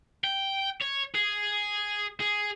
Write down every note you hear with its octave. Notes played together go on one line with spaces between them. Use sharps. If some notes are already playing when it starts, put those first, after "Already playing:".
G5
C#5
G#4
G#4